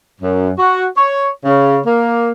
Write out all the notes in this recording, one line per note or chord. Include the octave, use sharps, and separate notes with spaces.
F#2
F#4
C#5
C#3
A#3